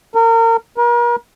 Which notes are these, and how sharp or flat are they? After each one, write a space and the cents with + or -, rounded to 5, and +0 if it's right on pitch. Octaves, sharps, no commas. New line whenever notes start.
A#4 -30
A#4 +40